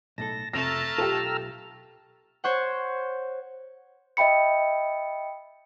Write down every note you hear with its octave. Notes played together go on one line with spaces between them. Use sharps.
B1 A2 A4 A5 A#6
F2 C3 A3 A5 A#5 E6 F6 A#6
B1 F4 G4 A4
C5 C#5 F#5
D#5 E5 G5 B5 C#7